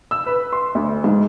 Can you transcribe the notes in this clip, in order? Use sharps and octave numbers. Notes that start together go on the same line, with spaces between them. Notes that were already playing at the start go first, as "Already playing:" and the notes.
E6
B4
C6
D2
G#2